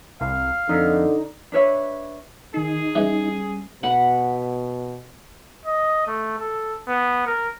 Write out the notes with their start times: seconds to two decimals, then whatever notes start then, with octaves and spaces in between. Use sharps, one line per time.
0.21 C2 F5
0.69 F2 D3 D#4
1.52 D4 B4 C#5 E5
2.54 D#3 D#4 G#4 C7
2.95 E3 G3 G#3 C#4
3.83 B2 F#5 B5
5.66 D#5
6.07 A3
6.38 A4
6.88 B3
7.27 A#4